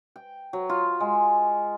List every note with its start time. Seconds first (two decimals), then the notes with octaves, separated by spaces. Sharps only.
0.16 G5
0.53 F#3
0.69 F4
1.01 G#3